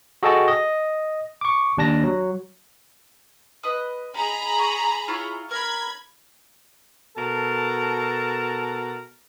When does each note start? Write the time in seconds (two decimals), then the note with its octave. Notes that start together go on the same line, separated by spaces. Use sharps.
0.23 F#4 G#4 A4 D#5 G5 A5
0.48 D#5
1.41 C#6 D6
1.78 D#2 D4 A5 A#6
2.04 F#3
3.63 B4 D#5 D#6
4.14 D#4 G#4 A#5 B5
4.59 G#5 C#6
5.08 E4 F4 C#5
5.51 A#4 B5 G#6
7.17 B2 A4 A#4 A5